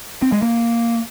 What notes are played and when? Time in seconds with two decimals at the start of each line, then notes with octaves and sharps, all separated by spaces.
0.22 C4
0.32 G#3
0.42 A#3